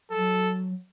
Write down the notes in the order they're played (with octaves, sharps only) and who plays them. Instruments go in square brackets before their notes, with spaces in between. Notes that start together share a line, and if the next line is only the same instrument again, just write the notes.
[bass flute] F#3 [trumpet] A4